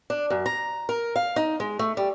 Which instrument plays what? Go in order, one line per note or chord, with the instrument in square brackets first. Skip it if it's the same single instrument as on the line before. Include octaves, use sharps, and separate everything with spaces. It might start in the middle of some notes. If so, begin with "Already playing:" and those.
[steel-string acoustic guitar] D4
F#2
A#5
A#4
F5
D#4
G#3
A3
G3